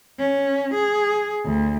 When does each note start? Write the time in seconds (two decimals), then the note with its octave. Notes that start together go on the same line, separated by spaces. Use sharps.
0.19 C#4
0.74 G#4
1.45 D2